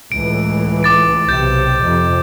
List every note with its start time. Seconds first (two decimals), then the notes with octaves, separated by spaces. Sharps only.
0.12 C#2 A2 E3 D7
0.83 D6 A6 D7
1.29 B1 C3 G6 A6
1.81 F2 C3